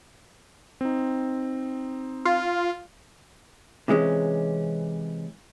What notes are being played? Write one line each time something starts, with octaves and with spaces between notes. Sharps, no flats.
C4 D#4
F4
C3 E3 G#3 C#4